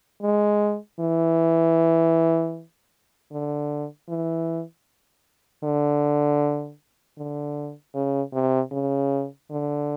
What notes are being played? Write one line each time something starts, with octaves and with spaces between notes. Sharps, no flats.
G#3
E3
D3
E3
D3
D3
C#3
C3
C#3
D3